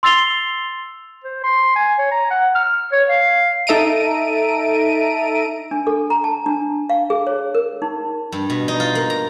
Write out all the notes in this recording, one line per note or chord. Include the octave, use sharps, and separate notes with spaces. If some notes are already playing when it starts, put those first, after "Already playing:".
C6 E6 A6 C7 F7 G7
C5
C6
G#5
C#5
A#5
F#5
F6
C#5
F5
D#4 A4 E5 A#5 D7 D#7
D4
A4
A#5
A5
D4
F5
G#4
C#5
A#4
D#4
G2
B2
D#4
F4
A#3
A#5